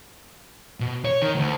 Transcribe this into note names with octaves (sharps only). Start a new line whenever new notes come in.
B2
C#5
D#3
D2